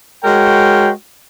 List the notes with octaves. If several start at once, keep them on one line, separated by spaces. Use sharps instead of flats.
G#3 F#4 A#4 C#5 G5